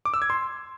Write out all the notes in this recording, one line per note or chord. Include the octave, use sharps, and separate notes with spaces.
D6
E6
G#6
C6